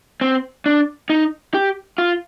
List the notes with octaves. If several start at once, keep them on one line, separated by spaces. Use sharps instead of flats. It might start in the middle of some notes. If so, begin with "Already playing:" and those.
C4
D4
D#4
G4
F4